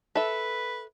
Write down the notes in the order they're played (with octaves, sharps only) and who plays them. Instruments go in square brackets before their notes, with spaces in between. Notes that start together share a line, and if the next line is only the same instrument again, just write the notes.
[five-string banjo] A4 E5 [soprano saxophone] B4